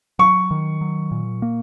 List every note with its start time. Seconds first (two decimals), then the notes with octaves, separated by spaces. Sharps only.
0.19 F#3 C#6
0.51 D#3
0.81 F#3
1.11 A#2
1.42 A#3